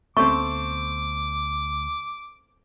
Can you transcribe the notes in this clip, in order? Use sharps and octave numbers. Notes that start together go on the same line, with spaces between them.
D2 A3 B3 C4 C#6 D6